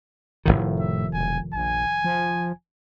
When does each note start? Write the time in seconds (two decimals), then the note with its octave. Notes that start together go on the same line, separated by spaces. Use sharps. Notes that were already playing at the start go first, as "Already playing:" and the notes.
0.45 F1 B1 A2 D#3
0.79 E5
1.13 E1 G#5
1.54 A#1 G#5
2.04 F3